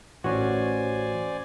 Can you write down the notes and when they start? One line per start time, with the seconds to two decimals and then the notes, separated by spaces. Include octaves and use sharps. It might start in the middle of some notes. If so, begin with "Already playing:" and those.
0.24 A1 C#4 F#4 C5 D5 G#5